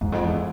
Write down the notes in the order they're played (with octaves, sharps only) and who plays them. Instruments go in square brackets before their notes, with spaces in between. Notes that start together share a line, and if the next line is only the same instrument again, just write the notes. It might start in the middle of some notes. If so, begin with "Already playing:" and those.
[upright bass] E2 [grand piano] G#2
[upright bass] F2
E2